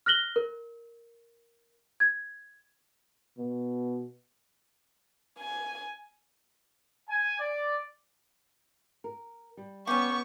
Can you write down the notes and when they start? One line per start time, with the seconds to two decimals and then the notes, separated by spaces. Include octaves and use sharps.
0.06 F6 F#6 A#6 F#7 G7
0.36 A#4
2.00 G#6
3.38 B2
5.39 G#5
7.09 G#5
7.38 D5
9.04 A#4
9.57 G3
9.87 B3 C#4 G4 C#6